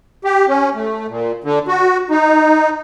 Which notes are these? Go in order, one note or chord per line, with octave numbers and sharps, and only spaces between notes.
G4
C#4
A3
A#2
D3
F#4
D#4